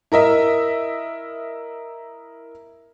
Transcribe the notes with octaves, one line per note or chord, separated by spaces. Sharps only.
E4 A#4 D#5 E5